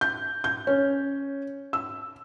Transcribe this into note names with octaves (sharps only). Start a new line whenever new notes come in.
G6
G6
C#4
E6